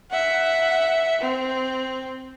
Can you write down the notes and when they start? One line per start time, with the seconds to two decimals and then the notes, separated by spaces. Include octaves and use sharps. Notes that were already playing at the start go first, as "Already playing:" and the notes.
0.11 E5 F#5
1.21 C4